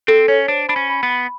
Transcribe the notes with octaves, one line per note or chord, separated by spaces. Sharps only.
C4 A4
C#4 C#5
D4 C5
D4 B5
C#4
B5
B3
B5